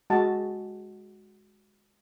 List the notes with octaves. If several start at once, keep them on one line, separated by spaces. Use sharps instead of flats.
G#3 F#4 D#5 A5